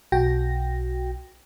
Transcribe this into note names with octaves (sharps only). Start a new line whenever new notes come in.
B1 F#4 G5 A#6